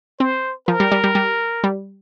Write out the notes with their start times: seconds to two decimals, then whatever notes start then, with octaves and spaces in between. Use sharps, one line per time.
0.20 C4 C5
0.67 F3 A#4
0.80 G3
0.92 G3
1.04 G3
1.15 G3
1.64 G3